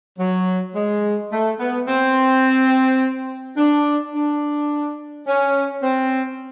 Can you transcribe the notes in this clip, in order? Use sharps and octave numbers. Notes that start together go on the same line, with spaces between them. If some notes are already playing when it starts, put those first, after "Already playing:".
F#3
G#3
A3
B3
C4
D4
D4
C#4
C4